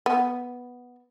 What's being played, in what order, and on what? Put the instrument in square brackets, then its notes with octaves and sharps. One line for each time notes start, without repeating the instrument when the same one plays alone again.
[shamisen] B3